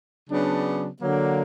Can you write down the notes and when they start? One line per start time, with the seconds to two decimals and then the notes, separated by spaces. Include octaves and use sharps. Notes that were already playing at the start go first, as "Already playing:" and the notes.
0.30 C#3 F#3 B3 D4
1.02 D3 F#3 A#3